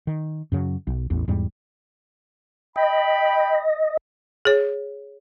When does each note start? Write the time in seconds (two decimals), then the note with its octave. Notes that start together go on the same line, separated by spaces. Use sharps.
0.07 D#3
0.52 F#2 C#3 F#3
0.87 B1
1.10 A1 E2
1.28 E2 G#2 G3
2.76 D#5 G5 B5
4.45 G#4 C#5